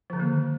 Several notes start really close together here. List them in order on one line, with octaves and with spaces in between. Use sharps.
F3 D3 D#3 A#3